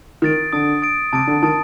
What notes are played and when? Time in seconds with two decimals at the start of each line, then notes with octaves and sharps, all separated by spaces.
0.22 D#3 D#6 A6 D7
0.53 D3 D#6 A6 D7
0.82 D#6 A6 D7
1.13 C3 A5 D#6 A6 D7
1.27 D3
1.43 D#3 A5 D#6 A6 D7